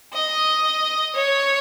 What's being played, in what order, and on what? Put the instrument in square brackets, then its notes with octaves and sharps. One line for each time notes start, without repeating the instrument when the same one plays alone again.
[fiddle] D#5
C#5